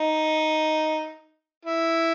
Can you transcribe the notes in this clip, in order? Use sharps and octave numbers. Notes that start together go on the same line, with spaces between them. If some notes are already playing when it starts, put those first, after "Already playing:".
Already playing: D#4
E4